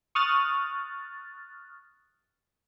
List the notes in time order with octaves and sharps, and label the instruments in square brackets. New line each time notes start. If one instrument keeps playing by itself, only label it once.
[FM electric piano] C#6 D#6 F6 F#6 A6